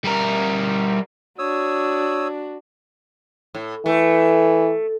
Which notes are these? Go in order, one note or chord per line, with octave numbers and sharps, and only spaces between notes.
G3 A#4
D4 F#4 C#5 D#6 E6
A2
E3 A3